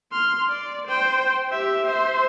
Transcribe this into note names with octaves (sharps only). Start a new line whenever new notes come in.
C6 F6
D5
C5 G5
G4 E5
C5 E5